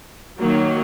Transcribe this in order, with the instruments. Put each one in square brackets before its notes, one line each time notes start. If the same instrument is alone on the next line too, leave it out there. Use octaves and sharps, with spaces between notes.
[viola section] D#3 F#3 A#3